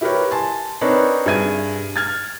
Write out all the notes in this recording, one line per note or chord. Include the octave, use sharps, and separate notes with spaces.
E4 G4 A#4 B4 C#5
G#5 A5 C6
C4 D4 D#4 A#4 B4 C#5
G2 G#4 E5 G#6 D#7
F6 G#6 A6